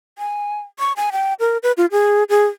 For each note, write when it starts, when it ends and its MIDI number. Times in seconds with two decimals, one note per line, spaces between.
0.18 0.60 80
0.79 0.92 85
0.97 1.10 80
1.12 1.34 79
1.40 1.58 70
1.63 1.72 71
1.77 1.86 65
1.92 2.24 68
2.29 2.46 68